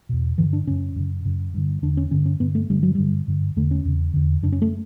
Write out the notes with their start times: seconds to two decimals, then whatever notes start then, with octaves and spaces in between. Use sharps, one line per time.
0.09 E2 B2
0.37 G2 D3 E3
0.53 D4
0.67 F#2 C#3 C#4
0.96 F#2 C#3
1.25 F#2 C#3
1.54 G2 D3
1.82 E2 D3 D4
1.97 C#4
2.11 G2 D3 C#4
2.26 C#4
2.40 G2 D3 B3
2.55 A3
2.70 G2 D3 G3
2.83 F#3
2.95 G2 D3 G3
3.28 G2 D3
3.56 E2 D3 A3
3.71 C#4
3.85 E2 C#3
4.14 E2 D3
4.42 F#2 C#3 D4
4.52 C#4
4.62 A3